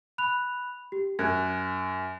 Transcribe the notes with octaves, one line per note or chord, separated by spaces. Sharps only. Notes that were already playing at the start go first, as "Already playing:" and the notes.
B5 F#6 F7
G4
F#2 G#5 F#6 G#6